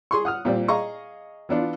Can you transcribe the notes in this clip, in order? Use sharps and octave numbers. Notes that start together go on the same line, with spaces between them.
G#4 C6 C#6
F#5 D#6 F6
A#2 G3 C4
G#4 D#5 F5 A#5 C#6
E3 B3 D4 F4